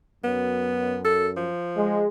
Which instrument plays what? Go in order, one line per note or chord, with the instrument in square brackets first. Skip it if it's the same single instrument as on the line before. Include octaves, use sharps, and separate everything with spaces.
[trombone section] F#2 [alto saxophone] B3
[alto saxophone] A4
F3
[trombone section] G#3